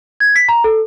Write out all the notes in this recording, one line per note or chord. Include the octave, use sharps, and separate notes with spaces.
G#6
B6
A#5
A4